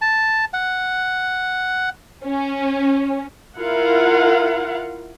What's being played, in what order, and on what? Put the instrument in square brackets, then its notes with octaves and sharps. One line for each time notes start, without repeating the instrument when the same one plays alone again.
[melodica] A5
F#5
[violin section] C#4
[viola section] E4 F4 A#4 F5 F#5